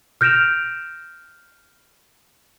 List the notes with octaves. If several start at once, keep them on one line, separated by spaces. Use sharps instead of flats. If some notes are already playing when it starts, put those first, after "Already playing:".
F6 G6 A#6 D7 E7 F7